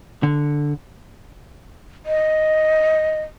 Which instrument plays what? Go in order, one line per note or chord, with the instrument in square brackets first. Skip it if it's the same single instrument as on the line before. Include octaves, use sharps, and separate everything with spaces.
[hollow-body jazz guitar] D3
[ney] D#5